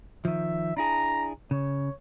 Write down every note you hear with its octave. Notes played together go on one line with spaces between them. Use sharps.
D#3 F3 E5
D4 E4 G#4 A#5
C#3 C#5